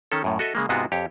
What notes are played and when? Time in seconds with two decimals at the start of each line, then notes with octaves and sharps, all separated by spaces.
0.12 D#3 C#4 A4
0.24 F#2 A2
0.39 F#4 A4 D#5 E5
0.55 C#3 G#3 A#3
0.69 G#2 C3 G#3 B3 F4 F#4
0.92 F2 G4 C#5